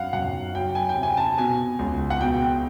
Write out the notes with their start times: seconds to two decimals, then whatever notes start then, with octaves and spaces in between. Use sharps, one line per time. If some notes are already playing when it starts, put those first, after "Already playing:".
Already playing: F#2 F5 F#5
0.13 F#2 F#5
0.55 F#3 G5
0.75 G#5
0.89 G5
0.95 C3
1.03 G#5
1.17 A5
1.37 B2 G#5
1.79 C#2
2.10 F#5
2.21 B2 G5